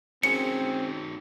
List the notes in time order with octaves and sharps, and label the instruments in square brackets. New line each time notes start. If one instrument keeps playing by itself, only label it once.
[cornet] C4 [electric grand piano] C#4 G#4 [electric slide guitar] D#4 F#4 A#4 [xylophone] C#7